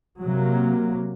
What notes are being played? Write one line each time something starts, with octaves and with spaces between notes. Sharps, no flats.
C3 F#3 A#3